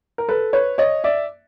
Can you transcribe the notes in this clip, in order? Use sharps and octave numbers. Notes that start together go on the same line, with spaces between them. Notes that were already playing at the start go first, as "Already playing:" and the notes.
A#4
A4 B4
B4 C#5
C#5 D#5
D5 E5